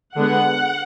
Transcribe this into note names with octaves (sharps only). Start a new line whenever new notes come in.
D3 G#3 B3 F#5